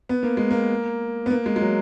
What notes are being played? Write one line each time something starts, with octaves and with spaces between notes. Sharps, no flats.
B3
A#3
G#3
A#3
B3
A#3
G#3
G#3
F#3